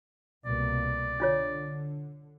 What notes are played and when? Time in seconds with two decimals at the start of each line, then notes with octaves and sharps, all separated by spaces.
0.46 C2 B2 A#3 D5
1.20 D3 D4 F4 C#5